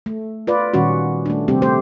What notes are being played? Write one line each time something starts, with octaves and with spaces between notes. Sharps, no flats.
A3
F4 B4 D5
A#2 D#3 G3 C#4 F#4
A3 D4
C3 G3 C4 G4
A3 G4 C5